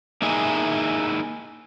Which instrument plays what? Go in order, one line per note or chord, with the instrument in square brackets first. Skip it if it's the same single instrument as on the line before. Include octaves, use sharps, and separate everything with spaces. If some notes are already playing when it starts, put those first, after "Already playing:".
[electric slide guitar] A#3 D#4 E4 G#4